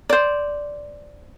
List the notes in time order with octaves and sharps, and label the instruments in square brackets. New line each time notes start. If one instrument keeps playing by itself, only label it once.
[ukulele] C5 D5